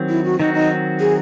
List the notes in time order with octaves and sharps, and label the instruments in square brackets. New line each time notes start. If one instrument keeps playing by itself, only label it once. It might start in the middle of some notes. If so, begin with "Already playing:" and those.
Already playing: [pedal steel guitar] D#3 F#3 C4
[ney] E4
F#4
[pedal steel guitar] D#3 F#3 C4 F#4 [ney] D#4
[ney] D#4
G#4